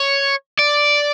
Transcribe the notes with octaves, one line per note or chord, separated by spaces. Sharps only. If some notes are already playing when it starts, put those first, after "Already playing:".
Already playing: C#5
D5